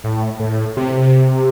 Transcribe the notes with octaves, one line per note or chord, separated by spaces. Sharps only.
A2
A2
C3